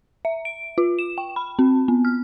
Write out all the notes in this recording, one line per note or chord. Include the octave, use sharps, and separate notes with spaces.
E5
D7
F4
E7
G5
B5
C4
B3
F6